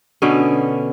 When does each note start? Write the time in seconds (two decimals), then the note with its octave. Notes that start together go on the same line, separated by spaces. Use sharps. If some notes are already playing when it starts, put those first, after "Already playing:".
0.22 B2 D3 B3 C#4